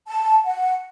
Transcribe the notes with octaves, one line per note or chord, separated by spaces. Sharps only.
A5
F#5